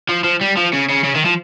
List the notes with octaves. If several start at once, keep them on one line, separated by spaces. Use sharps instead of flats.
F3
F3
G3
F3
C#3
C#3
C#3
D#3
F3